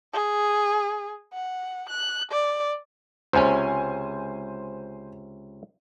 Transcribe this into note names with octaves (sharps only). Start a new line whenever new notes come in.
G#4
F#5
F#6
D5
C#2 C3 C#4 C5 G#5